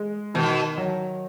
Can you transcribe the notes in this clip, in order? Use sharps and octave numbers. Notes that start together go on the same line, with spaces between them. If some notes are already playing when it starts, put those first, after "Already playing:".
Already playing: G#3
B2 D#3
F#3